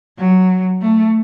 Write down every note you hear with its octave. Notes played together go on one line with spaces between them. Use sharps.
F#3
A3